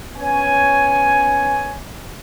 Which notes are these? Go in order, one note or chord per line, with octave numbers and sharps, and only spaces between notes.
B3 C#4 C#5 G#5